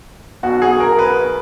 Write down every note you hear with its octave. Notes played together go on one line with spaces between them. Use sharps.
B1 B2 F#4
G#4
A#4
B4